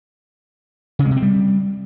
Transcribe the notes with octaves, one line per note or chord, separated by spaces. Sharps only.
C#3
G#3
C3
C4
G3